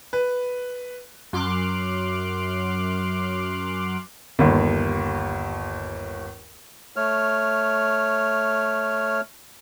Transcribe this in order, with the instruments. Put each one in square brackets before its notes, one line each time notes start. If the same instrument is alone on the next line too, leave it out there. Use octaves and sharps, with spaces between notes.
[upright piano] B4
[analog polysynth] F#2 C6 D6 F6 F#6
[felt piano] G1 D#2
[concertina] A3 C#5 F6